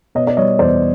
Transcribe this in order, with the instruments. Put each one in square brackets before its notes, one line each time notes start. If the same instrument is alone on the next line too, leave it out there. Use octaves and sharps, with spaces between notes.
[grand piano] B2 C#5 D#5
D5
G3 C#5 D#5
E2 C5 D5